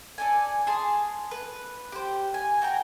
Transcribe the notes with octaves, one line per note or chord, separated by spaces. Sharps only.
A4 D5 G#5
G#4 A5 C6
B4
G4 C5
G#5
F#4 G5 A#5